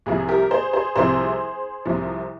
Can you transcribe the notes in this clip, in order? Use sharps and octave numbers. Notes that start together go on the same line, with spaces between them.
C2 C3 F3 G#4
G4 A#4
G#4 C5
G#4 C5
C2 C3 F3 G#4 C5
C2 C3 F3